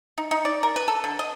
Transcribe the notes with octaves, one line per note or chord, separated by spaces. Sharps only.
D#4
D#4
D5
A#4
B4
A4
D3
D#5